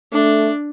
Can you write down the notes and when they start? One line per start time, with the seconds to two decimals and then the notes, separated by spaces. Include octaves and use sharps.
0.13 A3 D4